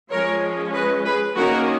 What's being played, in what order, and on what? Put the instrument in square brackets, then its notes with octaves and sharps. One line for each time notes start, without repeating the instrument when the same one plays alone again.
[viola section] F3 G#3 C#4 A#4 C#5
B4 D#5
G#4 B4
D#3 A#3 C#4 F#4 A#4